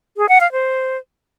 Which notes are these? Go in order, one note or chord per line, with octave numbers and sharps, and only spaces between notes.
G#4
F#5
F5
C5